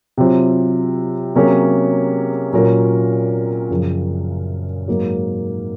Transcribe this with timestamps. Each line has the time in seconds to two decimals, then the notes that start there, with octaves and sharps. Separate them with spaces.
0.18 C3 F#3 C4 F4 C5
1.35 C3 F#3 A#3 C#4 G#4
2.53 A#2 F#3 C#4 F4 A#4
3.70 F#2 C#3 F3
4.88 G#2 F#3 A#3 D#4